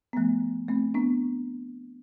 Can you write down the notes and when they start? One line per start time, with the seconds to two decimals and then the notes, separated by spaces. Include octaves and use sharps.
0.13 B3
0.17 F3 A3
0.69 A3 C4
0.94 B3 D4